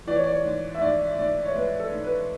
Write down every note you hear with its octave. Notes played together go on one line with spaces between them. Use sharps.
E3 D5
C#5
D5
C#5
G#2
E5
G#2 D5
G#2 D5
C#5
G#3 B4
A4
G#2
B4